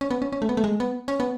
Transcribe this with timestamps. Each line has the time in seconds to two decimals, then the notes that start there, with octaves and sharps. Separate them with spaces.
0.01 C#4
0.10 B3
0.22 C#4
0.32 C#4
0.42 A3
0.49 B3
0.57 A3
0.64 G#3
0.80 B3
1.08 C#4
1.20 B3